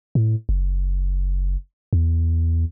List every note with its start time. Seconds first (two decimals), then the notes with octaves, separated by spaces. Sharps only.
0.15 A2
0.49 F#1
1.93 E2